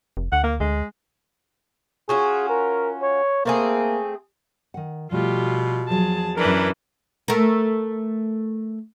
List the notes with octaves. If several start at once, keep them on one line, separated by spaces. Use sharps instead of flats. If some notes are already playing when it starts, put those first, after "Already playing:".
F1
D2 F#5
A#3
D2 G#3
C#4 F4 F#4 G#4
A#4
C#5
A3 A#3 C4 G#4
D#3 F#5
B2 F3 G3 A3 F4 G4
E2 F3 F#3 G#4 A5
F#2 E3 D4 A#4 B4
A3 A#4